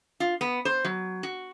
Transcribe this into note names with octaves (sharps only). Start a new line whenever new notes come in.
F4
B3
C5
F#3
F#4